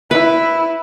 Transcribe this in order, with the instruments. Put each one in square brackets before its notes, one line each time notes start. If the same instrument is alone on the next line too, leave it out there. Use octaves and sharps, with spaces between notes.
[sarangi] E4 [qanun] B4